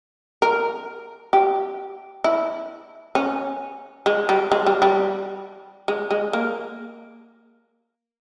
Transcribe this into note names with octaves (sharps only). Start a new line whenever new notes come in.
A#4
G4
E4
C#4
G#3
G3
G#3
G3
G3
G#3
G#3
A#3